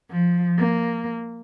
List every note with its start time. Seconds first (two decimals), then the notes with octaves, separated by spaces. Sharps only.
0.10 F3
0.58 A#3